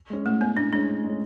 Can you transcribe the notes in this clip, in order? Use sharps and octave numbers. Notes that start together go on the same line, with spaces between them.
G#3 C#4
A2 A3
G#3 B3 C#4
A2 D4
G#3 C#4 D4
A2
G#3 C#4